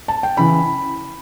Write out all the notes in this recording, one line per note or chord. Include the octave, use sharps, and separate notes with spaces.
A5
G5
C#3 E3 B5